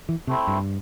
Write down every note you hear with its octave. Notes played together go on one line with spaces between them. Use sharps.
E3
C3 A3 C4 E4
G2